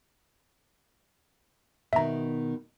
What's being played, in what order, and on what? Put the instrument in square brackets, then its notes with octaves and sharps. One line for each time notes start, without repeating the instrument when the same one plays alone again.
[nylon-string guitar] B2 D#3 [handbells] E5 A#5